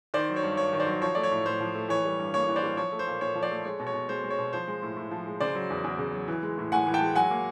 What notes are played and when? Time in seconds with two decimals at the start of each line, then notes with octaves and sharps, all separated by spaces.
0.14 D#3 C5 D5
0.29 F#3
0.36 C#5
0.43 G2
0.57 G2 C#5
0.73 D#3
0.80 C5 D5
0.87 F#3
1.02 F3 C#5
1.15 A3 D5
1.23 C#5
1.31 A2
1.46 A2 C5
1.60 F3
1.74 A3
1.89 E3 C#5
2.05 G3
2.19 G2
2.34 A#3 C#5
2.48 E3
2.56 C5 D5
2.63 G3
2.77 F3 C#5
2.92 A3
2.99 C5
3.07 A#2
3.21 A#2 C#5
3.35 F3
3.43 C5 D5
3.51 A3
3.65 G#3 C#5
3.80 B2
3.87 C#5
3.94 B2
4.09 G#3 C5
4.24 G#3
4.30 C#5
4.38 B2
4.53 F3 C5
4.68 G#3
4.83 A2
4.97 A2
5.11 F3
5.26 G#3
5.40 C#3 C5 D5
5.55 F#3
5.70 E2
5.84 E2
5.99 C#3
6.14 F#3
6.28 E3
6.43 G#3
6.58 A2
6.72 A2 F#5 G#5
6.87 E3
6.94 G5 A5
7.01 G#3
7.15 F#3 F#5 G#5
7.31 A#3